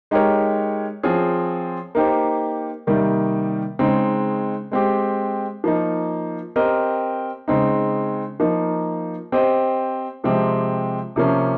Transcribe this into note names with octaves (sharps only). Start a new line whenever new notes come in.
G#3 D#4 G4 A#4 C#5
F3 C4 F4 G#4 C#5
A#3 D#4 G4 C5
C3 D#3 G3 A#3
C#3 G#3 C4 D#4
G#3 C4 G4
F3 A#3 D#4
C4 G4 A#4 D#5
C#3 G#3 C4 D#4
F3 A#3 D#4
C4 G4 C5 D#5
C3 F3 G#3 C4 G4
C3 F3 A#3 C#4